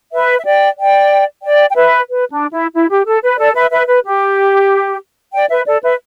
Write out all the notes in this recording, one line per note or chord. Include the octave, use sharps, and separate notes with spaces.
B4 E5
E5
D5 G5
D5 G5
D5 G5
G5
B4 E5
B4
D4
E4
E4
G4
A4
B4
A4 D5
B4 E5
B4 E5
B4
G4
D5 G5
B4 E5
A4 D5
B4 E5